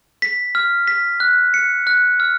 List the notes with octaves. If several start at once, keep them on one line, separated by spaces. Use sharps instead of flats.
B6
F6
B6
F#6
C#7
F#6
F6